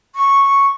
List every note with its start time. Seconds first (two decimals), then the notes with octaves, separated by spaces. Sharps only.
0.15 C#6